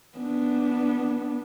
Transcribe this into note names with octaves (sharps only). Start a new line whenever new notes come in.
B3 D4